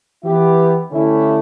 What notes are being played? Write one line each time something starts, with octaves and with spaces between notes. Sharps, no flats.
E3 B3 E4 G4
D3 A3 C#4 E4 G4